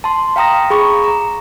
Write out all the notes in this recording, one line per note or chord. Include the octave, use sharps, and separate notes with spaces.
A5 C6
F5 G5 A#5 D#6 A#6
G#4 B5 C#6 D6
A#5